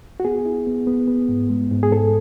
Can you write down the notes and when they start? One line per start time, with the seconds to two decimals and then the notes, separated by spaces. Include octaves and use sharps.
0.20 F#4
0.24 B3 G#4
0.46 E4
0.67 B3
0.87 B3
1.08 B3
1.29 G#2
1.50 G#3
1.71 G#2
1.83 G#4
1.91 G#2 A4